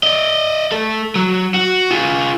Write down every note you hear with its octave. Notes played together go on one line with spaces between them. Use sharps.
D5 D#5
A3 A4
F#3
F#4
F4 G#4